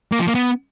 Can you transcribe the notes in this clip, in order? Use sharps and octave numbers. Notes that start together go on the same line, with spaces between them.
A#3
F3
A#3
B3